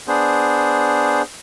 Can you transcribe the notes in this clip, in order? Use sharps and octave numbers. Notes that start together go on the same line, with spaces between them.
B3 D4 G#4 C5